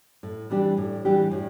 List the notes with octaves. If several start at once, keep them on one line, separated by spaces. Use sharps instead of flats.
A2
E3 G3 D4 G4
A2
E3 G3 D4 G4
A2